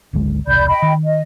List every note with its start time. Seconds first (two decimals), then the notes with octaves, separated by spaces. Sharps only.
0.13 G#1 D2 G#3
0.47 E1 C2 D5 B5 G6
0.68 D#5 G5 B5
0.82 D#3
1.05 D#5